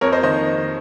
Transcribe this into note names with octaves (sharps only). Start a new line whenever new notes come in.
F2 A#4 C#5
C5 D#5
D#3 C5 D#5